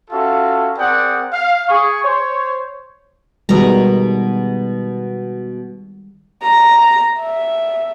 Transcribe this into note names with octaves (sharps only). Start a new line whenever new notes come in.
C#4 F4 F#4 A4 E5 F5
C4 G#4 A#4 D5 F#5 G5
F5
G#4 C#6
C5 C#5
B2 D#3 G3 G#3 A#5
A#5
E5